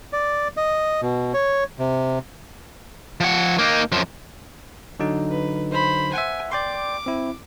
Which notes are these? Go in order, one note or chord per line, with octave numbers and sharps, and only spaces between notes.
D5
D#5
B2
C#5
C3
F3 F#5
A#3 D#4
F#2 F3
D3 F#3 D#4
B4
C5 B5
E5 F#5 G#5
D5 G5 C6 D6
C4 E4